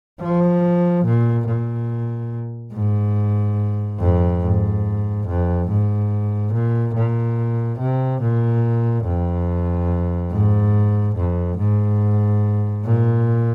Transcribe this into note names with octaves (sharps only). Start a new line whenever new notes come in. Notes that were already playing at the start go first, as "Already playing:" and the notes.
F3
A#2
A#2
G#2
F2
G#2
F2
G#2
A#2
A#2
C3
A#2
F2
G#2
F2
G#2
A#2